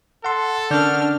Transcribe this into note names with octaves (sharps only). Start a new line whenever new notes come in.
A4 F#5 C6
D3 C#4 D4 A#4 D5 F#5 F6 G6